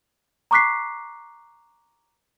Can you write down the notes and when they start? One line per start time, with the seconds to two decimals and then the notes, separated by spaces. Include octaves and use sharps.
0.51 A#5 C#6 D6 F#6 B6 C7